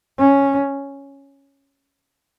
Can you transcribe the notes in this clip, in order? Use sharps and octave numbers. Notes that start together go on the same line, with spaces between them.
C#4